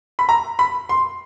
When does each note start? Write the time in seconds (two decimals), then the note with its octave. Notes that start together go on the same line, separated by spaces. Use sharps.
0.19 B5
0.29 A#5
0.59 B5
0.89 C6